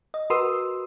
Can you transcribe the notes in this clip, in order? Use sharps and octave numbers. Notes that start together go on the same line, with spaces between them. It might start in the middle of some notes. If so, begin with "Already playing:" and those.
D#5
F#4 A#4 B4 C6 D#6 E6